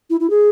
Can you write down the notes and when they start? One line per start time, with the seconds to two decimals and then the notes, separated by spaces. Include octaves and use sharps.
0.10 E4
0.20 E4
0.29 G#4